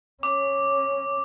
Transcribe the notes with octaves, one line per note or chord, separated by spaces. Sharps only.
C#4 D6